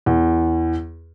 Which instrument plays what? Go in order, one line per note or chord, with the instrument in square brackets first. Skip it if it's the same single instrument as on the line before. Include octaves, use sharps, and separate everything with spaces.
[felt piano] E2